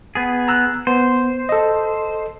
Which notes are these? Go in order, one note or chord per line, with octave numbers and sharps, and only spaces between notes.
B3 G#4
A#5 E6 F#6
B3 C5
A4 D#5